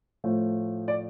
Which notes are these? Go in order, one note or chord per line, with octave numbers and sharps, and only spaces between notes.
A2 F3 A3
D5